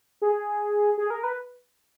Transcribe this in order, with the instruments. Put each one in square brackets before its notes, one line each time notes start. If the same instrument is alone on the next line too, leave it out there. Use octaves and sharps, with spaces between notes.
[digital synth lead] G#4
G#4
A#4
B4